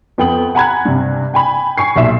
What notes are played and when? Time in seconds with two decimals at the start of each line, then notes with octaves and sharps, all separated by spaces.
0.18 F2 B3 G5 D#6 F#7
0.55 F#5 G#5 A#5 B5 F#6 G#6
0.85 G2 C3
1.34 G5 G#5 B5
1.78 G#5 C#6 C7
1.96 B1 A#2 E5 E7